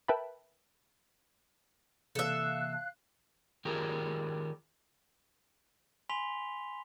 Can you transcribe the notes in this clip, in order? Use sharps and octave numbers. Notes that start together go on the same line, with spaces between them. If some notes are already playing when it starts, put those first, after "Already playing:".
A#4 B4 E5 G5 A5 B5
C3 E3 A#3 A4 E5 F5 F#6
D#3 F4 G4 G#4 A#4
G#5 B5 C6 B6 F7 G7